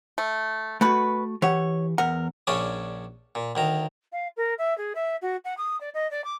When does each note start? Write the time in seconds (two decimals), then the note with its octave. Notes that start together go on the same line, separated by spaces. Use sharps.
0.18 A3
0.81 B2 A3 F#4 B4
1.42 E3 G4 C#5 F#5
1.98 E2 A#4 F#5
2.47 A#1 C#3 C#4 D4 C#5 D#6
3.35 A#2
3.55 D2 D#3 A#5
4.12 F5
4.37 A#4
4.58 E5
4.78 G#4
4.95 E5
5.22 F#4
5.45 F#5
5.57 D#6
5.81 D5
5.94 D#5
6.11 D5
6.24 D6